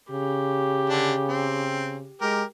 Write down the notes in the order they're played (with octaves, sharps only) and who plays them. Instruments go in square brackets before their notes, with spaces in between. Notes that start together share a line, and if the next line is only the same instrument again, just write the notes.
[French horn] C#3 [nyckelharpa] G4
[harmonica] D3 D4
C4
[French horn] G#3 [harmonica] G4 A#4